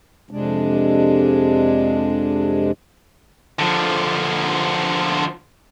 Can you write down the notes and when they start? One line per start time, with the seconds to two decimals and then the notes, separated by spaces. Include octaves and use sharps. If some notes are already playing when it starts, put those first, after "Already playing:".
0.31 F2 C3 G#3 D4
3.59 D3 F3